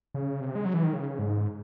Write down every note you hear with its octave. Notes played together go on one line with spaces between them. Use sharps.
C#3
C3
G#3
F#3
E3
D#3
C#3
G#2